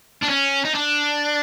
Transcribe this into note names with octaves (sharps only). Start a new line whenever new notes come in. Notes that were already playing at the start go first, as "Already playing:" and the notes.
D4
C#4
D#4
D4